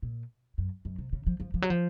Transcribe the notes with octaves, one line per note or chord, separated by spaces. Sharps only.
A#2
F#2
F#2
C3
C#3
F3
F3
F3
F#3
F3